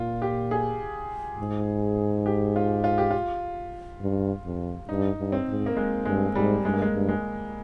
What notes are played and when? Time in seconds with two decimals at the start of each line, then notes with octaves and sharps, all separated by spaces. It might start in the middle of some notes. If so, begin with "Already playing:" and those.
Already playing: A#2 F4
0.22 G4
0.51 G#4
1.38 G#2
2.26 G4
2.56 F4
2.84 F4
2.98 G4
3.11 F4
4.01 G2
4.45 F2
4.89 G2 D#4
5.18 G2
5.32 C4
5.48 G#2
5.66 A#3
5.76 G#3
6.05 G2 G#3
6.35 G#2 G3
6.64 G2 G#3
6.73 A#3
6.82 G#3
6.93 G2
7.09 G#3